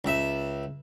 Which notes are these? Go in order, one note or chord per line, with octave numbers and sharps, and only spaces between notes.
C#2 E5